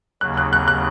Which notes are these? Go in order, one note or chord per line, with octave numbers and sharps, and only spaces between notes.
D#2 C#3 F#3 F#6
F#6
F#6
F#6